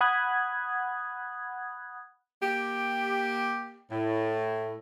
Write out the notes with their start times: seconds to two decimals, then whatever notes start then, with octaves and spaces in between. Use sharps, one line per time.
0.01 F#5 B5 D#6 F#6 G#6
2.42 A#3 G4
3.91 A2